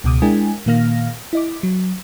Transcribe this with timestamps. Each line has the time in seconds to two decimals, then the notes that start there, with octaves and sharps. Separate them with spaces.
0.04 C#2 B2 D6 D#6
0.22 G#3 D4 E4 A#4 G5 G#5
0.66 A#2 D#3 A#3 F5 F6 A#6
1.33 E4 D#5 D6
1.63 F#3